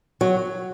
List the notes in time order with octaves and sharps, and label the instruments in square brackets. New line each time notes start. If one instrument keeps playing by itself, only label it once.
[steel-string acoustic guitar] F#3